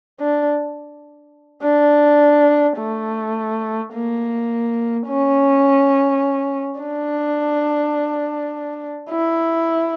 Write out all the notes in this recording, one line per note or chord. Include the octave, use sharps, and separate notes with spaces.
D4
D4
A3
A#3
C#4
D4
E4